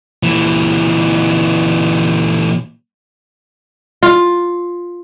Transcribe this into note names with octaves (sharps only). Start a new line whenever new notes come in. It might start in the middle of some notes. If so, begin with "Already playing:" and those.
A#2 E3
F4